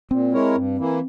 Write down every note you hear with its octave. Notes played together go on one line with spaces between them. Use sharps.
A#2 C4
G#3 E4 A#4 C#5
G2
E3 A#3 E4